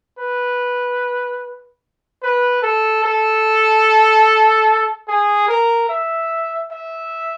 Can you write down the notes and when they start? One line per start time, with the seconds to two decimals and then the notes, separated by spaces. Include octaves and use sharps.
0.18 B4
2.22 B4
2.63 A4
3.04 A4
5.08 G#4
5.48 A#4
5.89 E5
6.71 E5